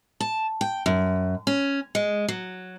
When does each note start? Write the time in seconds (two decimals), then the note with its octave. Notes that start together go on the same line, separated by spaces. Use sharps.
0.20 A5
0.61 G5
0.86 F#2
1.47 C#4
1.95 G#3
2.28 F#3